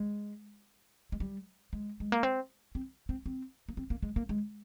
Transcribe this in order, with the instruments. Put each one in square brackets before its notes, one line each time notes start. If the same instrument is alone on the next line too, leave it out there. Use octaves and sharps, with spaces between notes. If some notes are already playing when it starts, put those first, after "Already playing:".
Already playing: [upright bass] G#3
G#3
G3
G#3
G#3
A#3
C4
C4
C4
C4
A#3
C4
A#3
G#3
A#3
G#3